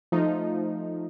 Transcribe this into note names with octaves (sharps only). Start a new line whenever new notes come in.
F3 A3 D#4